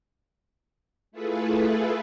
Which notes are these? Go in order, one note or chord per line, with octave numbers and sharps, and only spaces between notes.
A3 E4 F4 G#4 A4 B4